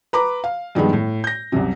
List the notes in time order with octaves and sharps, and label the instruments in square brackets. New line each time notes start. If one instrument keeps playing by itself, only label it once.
[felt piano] B4 A#5 D6
F5
G2 D#3 F3 G#3 B3
A2
G6 A#6
C2 F#2 C3